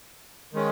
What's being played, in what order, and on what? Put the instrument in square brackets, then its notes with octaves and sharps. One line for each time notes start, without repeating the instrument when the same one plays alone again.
[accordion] D#3 G#3 C#4